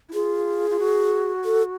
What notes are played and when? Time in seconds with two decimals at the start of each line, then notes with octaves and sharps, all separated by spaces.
0.09 E4
0.14 F4 G#4
0.70 F4
0.79 F#4
1.45 A4